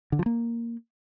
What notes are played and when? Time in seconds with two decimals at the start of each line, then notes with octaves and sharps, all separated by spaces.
0.12 D3
0.19 F3
0.26 A#3